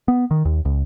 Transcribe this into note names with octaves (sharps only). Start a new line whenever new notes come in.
B3
D#3
D#2
C#2